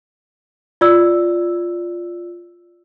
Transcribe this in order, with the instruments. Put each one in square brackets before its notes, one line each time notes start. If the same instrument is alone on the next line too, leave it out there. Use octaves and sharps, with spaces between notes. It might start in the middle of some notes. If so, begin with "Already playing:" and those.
[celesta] F4 D5 E6